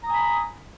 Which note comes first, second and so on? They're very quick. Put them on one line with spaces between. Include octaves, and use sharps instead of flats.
A#5 D#6 G#5 B5